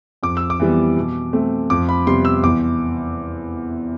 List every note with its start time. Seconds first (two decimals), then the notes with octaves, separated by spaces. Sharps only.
0.23 F2 D6
0.37 E6
0.50 D6
0.60 E3 G3 B3
0.97 B2
1.33 A3 C4
1.70 F2 D6
1.89 B5
2.06 C3 G3 B3 C6
2.25 E6
2.43 E2 D6